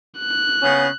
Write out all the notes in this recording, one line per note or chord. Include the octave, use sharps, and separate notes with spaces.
F#6
C#3 B3 C#4